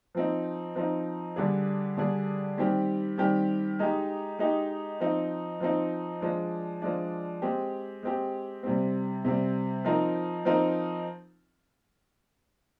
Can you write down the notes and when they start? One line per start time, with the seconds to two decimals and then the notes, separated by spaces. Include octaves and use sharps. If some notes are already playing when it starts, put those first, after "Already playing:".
0.15 F3 C4 D#4
0.76 F3 C4 D#4
1.36 D3 G3 D4 G#4
1.97 D3 G3 D4 G#4
2.57 D#3 G3 C4 G4
3.17 D#3 G3 C4 G4
3.79 G#3 D#4 G4
4.39 G#3 D#4 G4
5.00 F3 C4 D#4
5.60 F3 C4 D#4
6.21 F3 G#3 D4
6.82 F3 G#3 D4
7.42 G#3 C4 G4
8.03 G#3 C4 G4
8.63 C3 G3 C4
9.25 C3 G3 C4
9.85 F3 C4 D#4 A#4
10.45 F3 C4 D#4 A#4